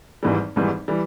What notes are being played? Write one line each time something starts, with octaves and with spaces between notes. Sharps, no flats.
G#1 G#2 E3 G3
G#1 G#2 E3 G3
E3 G3